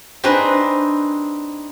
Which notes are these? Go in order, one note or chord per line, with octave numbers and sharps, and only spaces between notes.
C4 D4 D#4 G#4 B4 C5